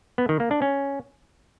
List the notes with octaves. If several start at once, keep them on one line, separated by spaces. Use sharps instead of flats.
B3
D#3
A#3
D4
C#4